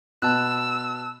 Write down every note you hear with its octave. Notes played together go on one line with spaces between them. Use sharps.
B2 A5 E6 F#6